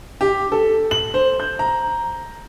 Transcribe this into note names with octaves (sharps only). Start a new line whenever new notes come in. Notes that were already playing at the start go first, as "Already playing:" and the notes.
G4
A4
F#7
C5
G6
A#5